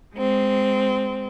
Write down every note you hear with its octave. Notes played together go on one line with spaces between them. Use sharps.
G#3 C4